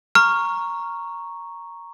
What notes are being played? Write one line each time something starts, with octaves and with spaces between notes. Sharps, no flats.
A#5 C#6 F6